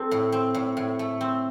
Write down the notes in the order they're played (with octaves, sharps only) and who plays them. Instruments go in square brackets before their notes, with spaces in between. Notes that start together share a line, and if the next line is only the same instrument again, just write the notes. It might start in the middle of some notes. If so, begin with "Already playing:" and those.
Already playing: [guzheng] C4 [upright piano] A4
[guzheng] A2
C4
A2
A2
A3
C4